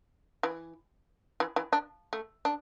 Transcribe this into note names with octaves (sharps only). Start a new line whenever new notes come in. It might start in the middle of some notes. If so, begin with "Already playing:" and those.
E3
E3
E3
D4
A3
D4